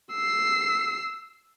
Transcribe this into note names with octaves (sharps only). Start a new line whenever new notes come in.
E6 C7